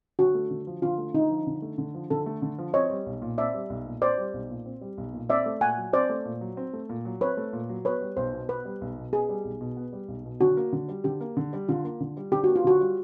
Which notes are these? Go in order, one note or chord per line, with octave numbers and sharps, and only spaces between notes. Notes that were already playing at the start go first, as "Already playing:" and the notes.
D3 F#4
A3
D3
F3
D3 F4
A3
D3 D#4
F3
D3
A3
D3
F3
D3 A4
A3
D3
F3
C4 C#5 D#5
G3
B1
A#2
C4 D5 E5
G3
B1
A#2
C4 C5 D5
G3
B1
A#2
C4
G3
B1
A#2
C4 D5 E5
A3
A#2 F#5 G#5
F#3
C4 C5 D5
A3
A#2
F#3
C4
A3
A#2
F#3
C4 B4 C#5
A3
A#2
F#3
B3 B4 C#5
G3
B1 C5
B2
B3 B4
G3
B1
B2
B3 G#4
G3
B1
B2
B3
G3
B1
B2
D3 F#4
A#3
D3
G3
D3 G4
A#3
D3
G3
D3 F4
A#3
D3
G3
D3 G4
A#3 F#4
F4
D3 F#4
G3